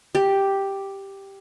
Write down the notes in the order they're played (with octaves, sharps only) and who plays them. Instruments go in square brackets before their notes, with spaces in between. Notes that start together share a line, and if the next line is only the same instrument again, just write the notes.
[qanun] G4